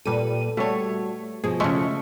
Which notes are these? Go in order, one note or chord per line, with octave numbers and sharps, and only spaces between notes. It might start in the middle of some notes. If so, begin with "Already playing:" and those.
A#2 G3 A4 B4 D#7
G3 A3 F#4 C#5
B2 F3 G#4
C#3 G#3 A3 C#6